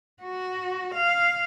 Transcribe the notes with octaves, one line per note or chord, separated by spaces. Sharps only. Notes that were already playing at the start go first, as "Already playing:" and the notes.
F#4
F5